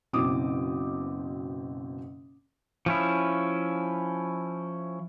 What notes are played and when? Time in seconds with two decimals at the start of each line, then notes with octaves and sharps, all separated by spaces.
0.13 F#1 B2 C4 D6 D#6
2.86 F3 C#4 E4